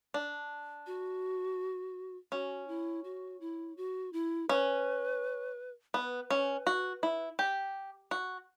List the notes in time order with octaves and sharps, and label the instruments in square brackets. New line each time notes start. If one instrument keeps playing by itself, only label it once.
[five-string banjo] D4
[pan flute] F#4
[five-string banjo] C#4 [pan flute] F#4
[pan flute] E4
F#4
E4
F#4
E4
[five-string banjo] C#4 [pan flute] B4
[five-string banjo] B3 [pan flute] B4
[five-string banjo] C#4
F#4
E4
G4
F#4